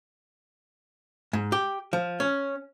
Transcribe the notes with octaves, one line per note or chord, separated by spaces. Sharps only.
G#2
G4
F3
C#4